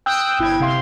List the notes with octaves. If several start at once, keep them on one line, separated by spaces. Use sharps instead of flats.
G5 D#6 E6 F#6 G6
G1 E4 G5 G#6
C3 F5 C6